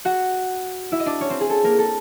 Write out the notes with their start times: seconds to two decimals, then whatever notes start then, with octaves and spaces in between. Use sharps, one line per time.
0.05 F#4 F#5
0.92 E4 E5
1.00 D#5
1.06 D4 D5
1.21 C#4 C#5
1.30 C4 C5
1.40 G#4
1.50 A4
1.64 A#3 A#4
1.79 A4